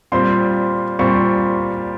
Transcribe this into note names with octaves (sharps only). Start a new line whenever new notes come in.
A#2 G3 C4 C6
A#2 G3 C4 C#6